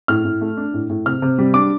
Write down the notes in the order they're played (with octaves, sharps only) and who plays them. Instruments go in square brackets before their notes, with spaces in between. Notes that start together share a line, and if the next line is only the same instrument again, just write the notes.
[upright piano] A2 F6
A2
A3
D4
A2
A2
C3 F6
C3
G3
D4 D6